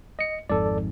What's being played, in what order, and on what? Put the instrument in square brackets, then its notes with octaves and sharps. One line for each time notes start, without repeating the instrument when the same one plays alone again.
[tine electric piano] D#5 C#7
[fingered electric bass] G#1 F2 G#2 [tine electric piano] A4 D5